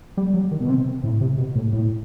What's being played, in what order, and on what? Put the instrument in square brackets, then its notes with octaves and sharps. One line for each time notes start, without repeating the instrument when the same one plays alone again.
[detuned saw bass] G3
F#3
D#3
B2
C3
A2
C3
B2
A2
A2